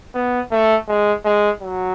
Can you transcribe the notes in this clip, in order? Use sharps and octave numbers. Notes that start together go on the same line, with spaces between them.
B3
A3
G#3
G#3
F#3